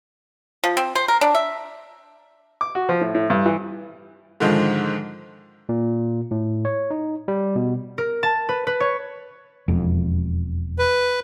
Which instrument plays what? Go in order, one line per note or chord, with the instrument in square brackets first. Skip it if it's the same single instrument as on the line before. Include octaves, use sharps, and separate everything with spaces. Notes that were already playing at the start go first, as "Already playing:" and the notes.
[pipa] F3
C4
C5
A#4
D4
E5
[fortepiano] D6
F#4
F3
A2
A2
G2
E3
[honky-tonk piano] G#2 D3 D#3 F3 G#3
[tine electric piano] A#2
A2
C#5
D#4
G3
B2
[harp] A#4
A5
B4
B4
C#5
[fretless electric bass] E1 F2
[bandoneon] B4